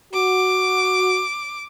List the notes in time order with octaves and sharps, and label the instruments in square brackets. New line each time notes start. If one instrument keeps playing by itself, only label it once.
[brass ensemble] F#4 [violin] D6